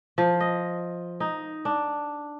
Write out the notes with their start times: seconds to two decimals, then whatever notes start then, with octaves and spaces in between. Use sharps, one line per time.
0.18 F3
0.40 D#5
1.20 D#4
1.65 D4